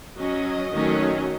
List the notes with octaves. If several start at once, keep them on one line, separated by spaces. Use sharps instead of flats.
F#3 C#4 D#5
D#3 F#3 A3 C#4